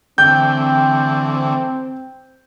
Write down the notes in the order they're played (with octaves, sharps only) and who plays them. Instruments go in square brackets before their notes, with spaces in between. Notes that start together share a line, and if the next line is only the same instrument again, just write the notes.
[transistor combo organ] D3 E3 A3 [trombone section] C4 [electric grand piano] G5 G6